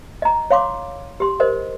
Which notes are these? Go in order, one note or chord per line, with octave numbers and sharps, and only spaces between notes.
D#5 A#5
C#5 F5 C6 D6
G4 C6
A#4 C5 D#5